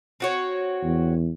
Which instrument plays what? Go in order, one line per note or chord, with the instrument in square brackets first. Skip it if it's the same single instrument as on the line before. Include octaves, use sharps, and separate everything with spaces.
[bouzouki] C4 F#4 C#5
[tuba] E2